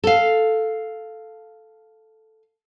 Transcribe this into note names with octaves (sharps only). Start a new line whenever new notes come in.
A4 F5